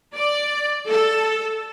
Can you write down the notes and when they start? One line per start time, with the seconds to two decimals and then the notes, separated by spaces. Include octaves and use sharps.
0.14 D5
0.90 A4